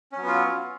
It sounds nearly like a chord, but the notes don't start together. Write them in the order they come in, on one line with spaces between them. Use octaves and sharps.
C#4 F#3 B3 F4